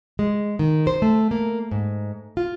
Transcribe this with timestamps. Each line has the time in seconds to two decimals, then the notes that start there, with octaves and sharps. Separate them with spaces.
0.19 G#3
0.59 D#3
0.87 C5
1.02 A3
1.31 A#3
1.71 G#2
2.37 F4